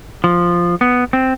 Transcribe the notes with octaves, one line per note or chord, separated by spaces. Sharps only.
F3
B3
C4